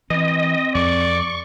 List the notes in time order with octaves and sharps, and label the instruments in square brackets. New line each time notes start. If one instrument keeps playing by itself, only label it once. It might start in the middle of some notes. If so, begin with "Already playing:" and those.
[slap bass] E3 [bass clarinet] C4 [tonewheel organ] D#5
[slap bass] F2 [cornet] D5 [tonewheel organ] C#6